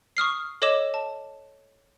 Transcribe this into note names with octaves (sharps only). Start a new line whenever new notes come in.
C#6 D#6 F6 C7
A4 C#5 D#5 D6 E7
A5